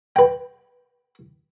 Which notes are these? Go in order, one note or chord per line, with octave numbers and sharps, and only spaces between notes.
B4 G5